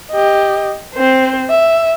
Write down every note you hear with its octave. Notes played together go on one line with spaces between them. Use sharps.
G4 D#5
C4 C5
E5